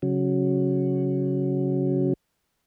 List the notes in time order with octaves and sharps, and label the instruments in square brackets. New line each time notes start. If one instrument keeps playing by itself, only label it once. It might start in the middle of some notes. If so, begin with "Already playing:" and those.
[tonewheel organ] C#3 F#3